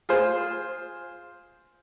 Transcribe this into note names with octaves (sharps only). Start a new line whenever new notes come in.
F4 G#4 C5